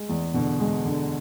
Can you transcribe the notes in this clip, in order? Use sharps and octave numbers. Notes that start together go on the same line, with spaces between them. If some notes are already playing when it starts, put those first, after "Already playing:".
Already playing: G#3
E2
B2 D3
G#3
D3